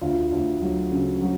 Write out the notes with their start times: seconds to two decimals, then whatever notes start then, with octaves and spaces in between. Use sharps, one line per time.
0.01 D2 F4
0.32 D2
0.62 F#3
0.92 C#3
1.22 F#3